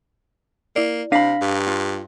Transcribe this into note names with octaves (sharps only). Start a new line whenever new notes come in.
A#3 E4 D5
C3 D4 F5 B5 A#6 B6
G2
F4